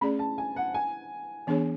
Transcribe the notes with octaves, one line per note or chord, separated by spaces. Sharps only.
A3 C#4 G#4 D5 B5
A5
G#5
F#5
G#5
E3 B3 D4 G#4 C#5